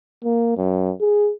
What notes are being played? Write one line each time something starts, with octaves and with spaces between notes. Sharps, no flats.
A#3
F#2
G#4